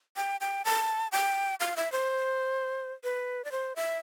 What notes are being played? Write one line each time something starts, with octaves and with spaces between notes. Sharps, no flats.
G5
G5
A5
G5
F5
E5
C5
B4
D5
C5
E5